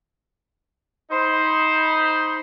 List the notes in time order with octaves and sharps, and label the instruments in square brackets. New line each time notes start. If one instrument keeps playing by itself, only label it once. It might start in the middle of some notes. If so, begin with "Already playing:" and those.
[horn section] D#4 C5 B5